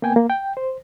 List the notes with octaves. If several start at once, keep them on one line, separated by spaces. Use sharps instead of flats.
A#3 B3 G5 G#5
A#3
G5
C5